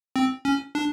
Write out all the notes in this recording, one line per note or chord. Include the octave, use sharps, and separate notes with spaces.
C4
C#4
D4